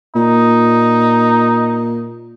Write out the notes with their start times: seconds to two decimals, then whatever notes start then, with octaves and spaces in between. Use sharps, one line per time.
0.15 A#2 D#4